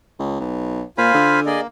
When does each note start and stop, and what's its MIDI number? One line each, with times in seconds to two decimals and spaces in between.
0.19 0.39 37
0.40 0.83 35
0.98 1.13 46
0.98 1.41 65
0.98 1.40 72
0.98 1.40 77
0.98 1.41 80
0.98 1.40 83
1.14 1.61 50
1.46 1.67 58
1.46 1.60 68
1.46 1.60 74
1.46 1.60 75